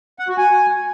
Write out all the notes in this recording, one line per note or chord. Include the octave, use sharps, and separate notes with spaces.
F#5
F#4
G#5